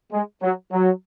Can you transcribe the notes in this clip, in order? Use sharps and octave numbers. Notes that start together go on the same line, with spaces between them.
G#3
F#3
F#3